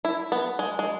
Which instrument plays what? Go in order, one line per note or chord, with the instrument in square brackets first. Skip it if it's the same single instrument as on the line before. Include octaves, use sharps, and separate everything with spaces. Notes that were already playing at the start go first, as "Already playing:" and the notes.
[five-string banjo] E4
B3
G#3
G#3